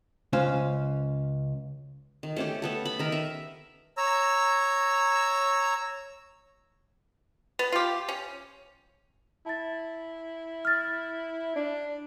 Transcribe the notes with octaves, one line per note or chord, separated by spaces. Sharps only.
C#2 C#4 C5 F5
D#3
A3 C#4 G4
A3 B3 A4
B5
D#3 A#4
E5
C#5 A#5 E6
B3
F4 G4
C#4
E4 A5 A6
F6 A6
D4